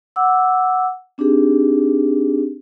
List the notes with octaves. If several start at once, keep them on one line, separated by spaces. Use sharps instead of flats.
F#5 D6 E6
C4 D4 D#4 G4 G#4